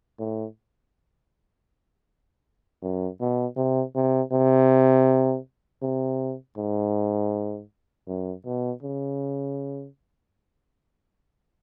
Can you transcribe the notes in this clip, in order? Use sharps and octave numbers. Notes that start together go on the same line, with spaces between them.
A2
F#2
B2
C3
C3
C3
C3
G#2
F#2
B2
C#3